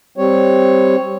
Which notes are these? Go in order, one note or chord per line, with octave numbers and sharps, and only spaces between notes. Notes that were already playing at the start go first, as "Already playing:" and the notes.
G3 C4 C#5